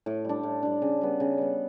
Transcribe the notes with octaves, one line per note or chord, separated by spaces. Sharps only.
A2
G3 D4
A2
G3 D4
C#3
G3 B3
C#3
G3 B3